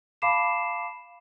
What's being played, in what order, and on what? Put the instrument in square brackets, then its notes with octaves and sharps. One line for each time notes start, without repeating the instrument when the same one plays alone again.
[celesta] F5 A5 B5 D6 C7 E7